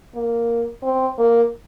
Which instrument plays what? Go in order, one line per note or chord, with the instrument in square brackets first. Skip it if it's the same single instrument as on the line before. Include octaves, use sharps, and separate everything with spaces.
[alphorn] A#3
C4
A#3